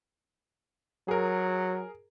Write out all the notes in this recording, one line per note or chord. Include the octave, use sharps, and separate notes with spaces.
F#3 G#4 A#4